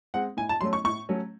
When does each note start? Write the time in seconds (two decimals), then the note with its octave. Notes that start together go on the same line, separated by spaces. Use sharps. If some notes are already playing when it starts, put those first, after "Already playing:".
0.14 G#3 C4 F#5
0.37 A2 G#5
0.49 A5
0.61 F#3 A3 C#4 C6
0.73 C#6
0.84 A2 C#6
1.09 F#3 A3 C#4